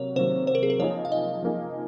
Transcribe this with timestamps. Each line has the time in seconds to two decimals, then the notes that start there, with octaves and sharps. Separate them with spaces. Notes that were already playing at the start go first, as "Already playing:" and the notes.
Already playing: C3 F#3 A#3 C#5
0.16 C3 D#3 F#3 A#3 C5
0.47 C5
0.55 A#4
0.63 G#4
0.70 A#4
0.79 F3 A#3 D#4 G#4 C#5
1.05 F5
1.12 D#5
1.43 F3 A#3 D#4 G#4